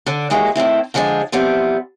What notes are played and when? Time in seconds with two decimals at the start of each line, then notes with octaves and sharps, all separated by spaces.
0.06 D3 D4
0.30 D#2 E3 G#3 A#3 F#4
0.55 A2 D#3 C4 E4
0.94 D3 F3 G#3 C4 D4
1.32 E3 F3 G3 B3 C4